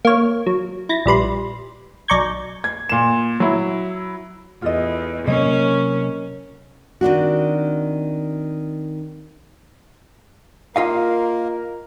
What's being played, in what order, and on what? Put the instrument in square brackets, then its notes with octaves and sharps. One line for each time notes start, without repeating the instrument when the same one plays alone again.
[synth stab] A#3 C#5
F#3
E4 A6 A#6
A#1 G3 B4 C6
B1 D5 A#5 C#6 G6 G#6
[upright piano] G#6
A#2 E7
F#3 E4
[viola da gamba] E2 [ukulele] F4 A4 D#5
[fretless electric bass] C3 F#3 A#3 [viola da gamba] C#4 [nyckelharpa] A#4 C#5 [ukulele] D#5
[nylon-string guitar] D#3 C4 D4 F#4
[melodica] A#3 [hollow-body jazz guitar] F4 D#5 F5 [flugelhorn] A#4